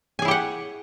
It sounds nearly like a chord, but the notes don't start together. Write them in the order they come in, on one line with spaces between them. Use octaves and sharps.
G#5 G#4 E4 G4 F#5